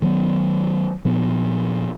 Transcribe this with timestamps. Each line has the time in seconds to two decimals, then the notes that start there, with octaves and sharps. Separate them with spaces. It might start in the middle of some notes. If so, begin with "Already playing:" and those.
0.02 D#3 F#3 B3
1.05 A#2 F3 B3